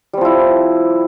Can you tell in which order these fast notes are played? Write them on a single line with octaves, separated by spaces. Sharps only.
G3 C4 F3 E4